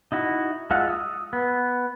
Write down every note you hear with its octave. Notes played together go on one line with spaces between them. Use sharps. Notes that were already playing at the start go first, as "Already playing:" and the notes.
D#4 E4 F#4
G#3 F4 E5 F#5
D#6 E6
B3